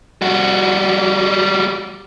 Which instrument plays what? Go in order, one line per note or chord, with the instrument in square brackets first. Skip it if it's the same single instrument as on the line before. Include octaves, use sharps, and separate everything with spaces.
[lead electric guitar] G3 F#4